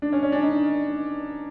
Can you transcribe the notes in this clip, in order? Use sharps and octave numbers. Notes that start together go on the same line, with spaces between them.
D4
C#4
C#4
D4
D#4